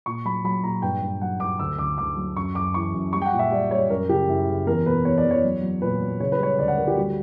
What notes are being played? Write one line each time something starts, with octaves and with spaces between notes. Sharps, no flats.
A#2 C#6
F#3 B5
F#3 B5
A#2 A#5
G2 G5
G2
F#3 F#5
G2 D6
D2 E6
D2 D6
D2 D6
F#3
F#2 C#6
F#2 D6
E3 C#6
F#2
G3 C#6
G5
F#5
A#2
E5
G3 D5
G3 C#5
F#2 A#4
C#3 G4
F#2 E4
C#3
E2 A#4
B2 B4
E2 C#5
D5
E2
C#5
F#3
F#3
A#2 B4
F#3
C#3 C#5
B4
G3 C#5
D2 D5
F#5
D2 A#4
G4
G3 F#4